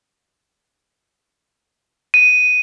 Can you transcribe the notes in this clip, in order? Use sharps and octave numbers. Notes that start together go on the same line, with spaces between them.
D#7